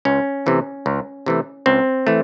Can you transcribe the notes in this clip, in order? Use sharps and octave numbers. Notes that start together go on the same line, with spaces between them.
C#2 C#4
C3 E3 A3
C#2
C3 E3 A3
C#2 C4
E3 A3